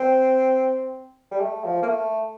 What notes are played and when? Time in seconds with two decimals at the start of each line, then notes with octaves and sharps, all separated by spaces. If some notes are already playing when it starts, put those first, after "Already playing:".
Already playing: C4
1.31 G3
1.41 A3
1.64 F3
1.82 A#3
1.88 A3